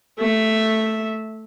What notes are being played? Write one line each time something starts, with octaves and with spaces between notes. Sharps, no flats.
A3 E5